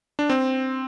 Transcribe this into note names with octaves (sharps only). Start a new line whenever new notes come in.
D4
C4